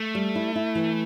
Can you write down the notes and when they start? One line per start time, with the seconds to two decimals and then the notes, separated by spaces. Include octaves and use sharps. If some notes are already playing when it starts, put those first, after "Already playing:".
Already playing: A3
0.15 G3
0.35 E4
0.55 E4
0.75 E3